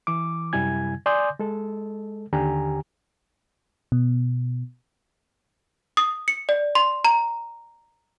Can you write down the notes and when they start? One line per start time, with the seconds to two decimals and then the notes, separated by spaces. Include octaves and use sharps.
0.07 E3 D6
0.53 F#2 C3 G3 E4 G#5 G#6
1.06 D5 G#5 C6 D6 D#6 G6
1.39 G#3 A4
2.33 D#2 D3 G4 G#5 A#5
3.92 B2
5.97 D#6
6.28 C#7
6.49 D5
6.75 C6
7.05 A#5